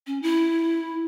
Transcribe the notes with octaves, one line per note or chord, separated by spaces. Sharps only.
C#4
E4